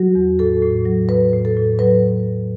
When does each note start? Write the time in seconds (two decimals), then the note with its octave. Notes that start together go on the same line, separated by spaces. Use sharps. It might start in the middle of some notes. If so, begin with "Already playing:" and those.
Already playing: F#3 F#4
0.15 E2
0.39 A2 A4
0.63 A2
0.86 F#3
1.09 F#3 B4
1.33 A2
1.45 A4
1.57 A2
1.79 F#3 B4